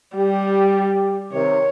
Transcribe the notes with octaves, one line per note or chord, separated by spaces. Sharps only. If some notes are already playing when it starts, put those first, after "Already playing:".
G3 G4
C3 D#3 C#5